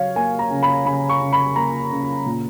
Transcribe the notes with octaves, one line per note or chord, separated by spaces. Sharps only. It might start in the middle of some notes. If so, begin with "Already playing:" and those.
Already playing: C#3 F#3 C#5 F5
A#3 G#5
A#5
C#3
B5
C#3 B5
C#6
C#3
B5
A#3 A#5
C#3
A#2